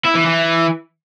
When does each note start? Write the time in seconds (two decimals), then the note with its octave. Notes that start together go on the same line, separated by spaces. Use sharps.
0.05 E4
0.15 E3
0.25 E3